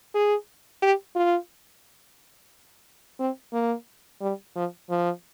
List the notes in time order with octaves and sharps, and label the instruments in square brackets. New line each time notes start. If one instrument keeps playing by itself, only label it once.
[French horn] G#4
G4
F4
C4
A#3
G3
F3
F3